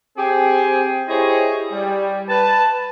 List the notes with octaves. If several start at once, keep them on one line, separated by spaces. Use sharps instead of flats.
C4 G4 G#4
E4 G4 G#4 C5 C#5 D#5
G3
B4 A5